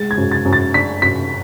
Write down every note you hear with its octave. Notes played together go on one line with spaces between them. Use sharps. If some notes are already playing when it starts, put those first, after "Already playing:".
Already playing: G#3 A6
G#6
F#2
A6
F#2
A6
D4 B6
F#2 B6